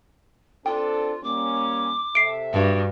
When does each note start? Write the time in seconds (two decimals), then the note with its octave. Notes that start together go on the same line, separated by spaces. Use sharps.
0.66 C4 D4 F4 A4 G5
1.24 G3 A#3 C#4 D6
2.15 C3 A4 E5 C7 D7
2.53 G2 F#4